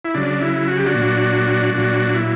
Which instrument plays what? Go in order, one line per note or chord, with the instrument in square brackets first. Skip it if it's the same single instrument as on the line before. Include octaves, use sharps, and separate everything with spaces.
[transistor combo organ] E4
C#3 F#3 D4
E4
F#4
G4
D4 F#4
A#2 F#3
A#2 F#3 D4 F#4
E4